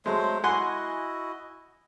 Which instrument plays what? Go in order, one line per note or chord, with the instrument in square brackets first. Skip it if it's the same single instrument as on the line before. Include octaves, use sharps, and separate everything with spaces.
[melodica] F#3 A3 C5 [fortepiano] G#3
[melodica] E4 F#4 D#5 [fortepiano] F#5 G#5 C6